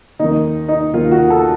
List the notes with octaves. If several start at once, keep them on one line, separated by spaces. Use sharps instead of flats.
D#2 D#3 D#4
D#4
D#2 D#3 F4
F#4
A4